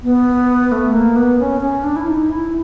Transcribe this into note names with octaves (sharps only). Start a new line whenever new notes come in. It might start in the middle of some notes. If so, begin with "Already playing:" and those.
B3
A3
A#3
B3
C#4
C#4
D4
E4
D#4
E4